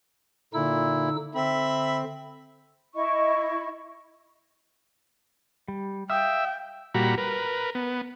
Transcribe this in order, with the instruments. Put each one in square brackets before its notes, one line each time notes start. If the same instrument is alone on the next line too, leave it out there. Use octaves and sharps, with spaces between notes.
[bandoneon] A#2 E4 [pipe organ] D3 D#4 E6
[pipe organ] D3 [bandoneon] C4 [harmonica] E5 B5
[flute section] E4 D#5 C#6
[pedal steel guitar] G3
[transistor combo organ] E5 [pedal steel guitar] F5 D#6 F6 [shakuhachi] G5
[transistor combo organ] A#2 G3 F#4 A#5 B5
A#4 B4
B3